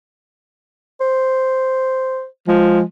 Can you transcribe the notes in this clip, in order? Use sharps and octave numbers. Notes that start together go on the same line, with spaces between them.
C5
F3 G#3